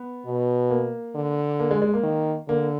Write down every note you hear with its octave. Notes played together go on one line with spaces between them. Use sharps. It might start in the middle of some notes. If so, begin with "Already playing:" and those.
Already playing: B3
B2
A#3
D3
A#3
G#3
G#3
A#3
D#3
D3 A#3